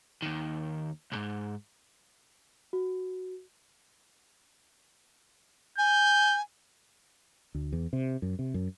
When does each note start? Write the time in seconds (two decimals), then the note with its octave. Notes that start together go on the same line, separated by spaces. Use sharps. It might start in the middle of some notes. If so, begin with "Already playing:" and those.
0.22 D#2 D#3
1.12 C2 G#2
2.73 F#4
5.78 G#5 G6
7.55 D2
7.73 E2
7.93 C3
8.22 F#2
8.39 C3
8.54 F#2